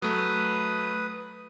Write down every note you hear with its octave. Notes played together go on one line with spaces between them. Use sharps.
F#3 A3 B4 D#6